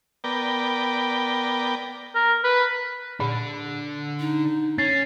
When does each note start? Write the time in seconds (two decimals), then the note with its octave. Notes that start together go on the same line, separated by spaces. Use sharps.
0.24 B3 A#4 D5 G5
2.15 A#4
2.44 B4
3.20 A#2 D3 D4
4.20 D#4
4.78 C#4 A6 C7